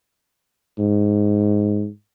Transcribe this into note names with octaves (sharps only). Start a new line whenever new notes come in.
G#2